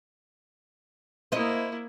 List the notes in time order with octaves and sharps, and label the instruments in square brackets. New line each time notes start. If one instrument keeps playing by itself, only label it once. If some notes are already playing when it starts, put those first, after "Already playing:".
[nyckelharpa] A#3 E4 [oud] C5 D#5